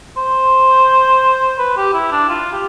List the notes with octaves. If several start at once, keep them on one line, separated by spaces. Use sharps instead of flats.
C5
B4
G4
E4
D4
F4
G4